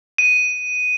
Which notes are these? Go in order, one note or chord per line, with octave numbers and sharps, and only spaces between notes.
D#7